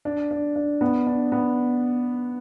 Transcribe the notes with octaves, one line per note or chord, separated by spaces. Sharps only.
D4
D4
D4
B3
D4
B3